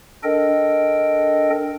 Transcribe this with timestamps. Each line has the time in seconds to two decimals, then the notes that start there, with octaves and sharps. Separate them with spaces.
0.24 D4 A4 A#4 D#5 G5